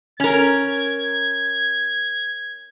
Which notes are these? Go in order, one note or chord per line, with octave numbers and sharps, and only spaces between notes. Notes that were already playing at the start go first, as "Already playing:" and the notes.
C#4 A#4 G#6